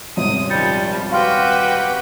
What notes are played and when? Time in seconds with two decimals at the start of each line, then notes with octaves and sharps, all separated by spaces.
0.17 D#1 G#1 C3 D#6
0.50 D#3 F3 G3 G6 A6 C#7
1.11 F#4 G4 B4 F5 G5 C6 F6